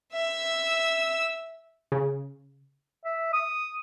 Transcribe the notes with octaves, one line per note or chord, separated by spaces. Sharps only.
E5 E6
C#3
E5
D#6